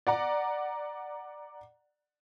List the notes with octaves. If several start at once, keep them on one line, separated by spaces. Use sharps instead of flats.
D5 F#5 A#5